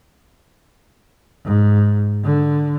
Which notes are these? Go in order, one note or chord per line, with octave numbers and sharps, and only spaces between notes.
G#2
D3